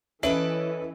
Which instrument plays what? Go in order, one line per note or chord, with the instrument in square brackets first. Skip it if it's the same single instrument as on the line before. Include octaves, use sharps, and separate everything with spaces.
[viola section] E3 [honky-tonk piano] C#4 D7 F#7 [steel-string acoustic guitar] A4 B4 D#5 [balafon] E5